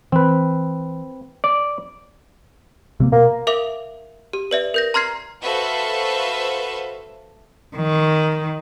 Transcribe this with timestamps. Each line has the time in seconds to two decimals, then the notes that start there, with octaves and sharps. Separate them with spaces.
0.12 E3 C4 B4
1.44 D5
3.00 C3 A3 A#3
3.12 B2 A#3
3.47 A#4 E5 F5 D6 F7
4.33 G4
4.51 B4 D5 E5
4.74 A#4 G6 A#6
4.94 A#5 C6 F6 G#6 C7
5.41 F#4 A4 B4 C5 E5 F5
7.76 D#3